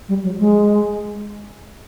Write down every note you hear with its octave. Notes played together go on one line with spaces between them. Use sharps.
G3
F#3
G#3